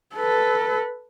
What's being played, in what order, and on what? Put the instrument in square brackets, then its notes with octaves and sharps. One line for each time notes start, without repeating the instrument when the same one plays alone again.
[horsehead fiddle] A4 B4